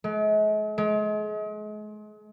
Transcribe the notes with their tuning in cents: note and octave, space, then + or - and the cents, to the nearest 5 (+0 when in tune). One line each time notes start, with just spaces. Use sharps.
G#3 +45
G#3 +35